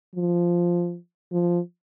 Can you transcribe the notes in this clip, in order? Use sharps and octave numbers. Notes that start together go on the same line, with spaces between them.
F3
F3